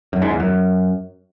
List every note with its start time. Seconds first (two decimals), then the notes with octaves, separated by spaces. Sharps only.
0.13 F#2
0.22 G#2
0.31 E2
0.40 F#2